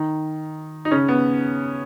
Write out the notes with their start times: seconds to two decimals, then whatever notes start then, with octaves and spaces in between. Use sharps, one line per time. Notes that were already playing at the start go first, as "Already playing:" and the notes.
Already playing: D#3 D#4
0.85 D#4
0.91 C#3 C#4
1.08 B3